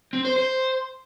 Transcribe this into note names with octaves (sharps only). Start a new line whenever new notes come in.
C4
C5
C5